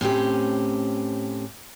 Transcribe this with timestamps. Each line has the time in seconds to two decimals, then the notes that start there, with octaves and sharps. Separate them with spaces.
0.01 A2 C4 C#4 G4